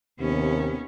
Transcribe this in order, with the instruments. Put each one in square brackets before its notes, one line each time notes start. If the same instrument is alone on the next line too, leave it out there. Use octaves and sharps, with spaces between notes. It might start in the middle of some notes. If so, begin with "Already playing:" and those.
[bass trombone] D#2 [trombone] C3 [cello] B3 C#4